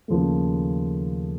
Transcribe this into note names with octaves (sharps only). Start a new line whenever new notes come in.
D#2 C#3 F3 A3